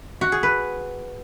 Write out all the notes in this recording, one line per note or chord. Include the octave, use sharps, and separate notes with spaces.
F#4
G#4
B4